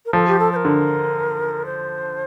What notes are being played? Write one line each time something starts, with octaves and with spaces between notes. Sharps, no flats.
A#4
F3 A4
G4
A4
C5
A#4
D3
C5